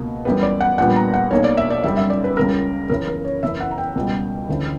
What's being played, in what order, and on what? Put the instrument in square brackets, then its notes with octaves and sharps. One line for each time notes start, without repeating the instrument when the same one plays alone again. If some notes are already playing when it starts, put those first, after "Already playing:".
Already playing: [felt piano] C#2 B2 A#3
F#2 E3 G3 B3 B4
D5
F#5
A#1 A#2 G3 B3 F#5
A#5
F#5
B1 B2 A#3 C#5
D5
E5
D5
F#2 C#3 G3 E5
E5
D5
B4
C#2 C#3 G3 A#4
F#2 C#3 E3 A#4
A#4
C#5
F#1 F#2 E3 E5
F#5
A#5
G5
C#2 B2 G3
D2 C#3 E3